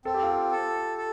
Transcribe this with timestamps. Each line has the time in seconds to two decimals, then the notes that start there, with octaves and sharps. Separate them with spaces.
0.05 C4 A4
0.14 G4
0.23 F4
0.31 G4
0.52 A4
0.98 A4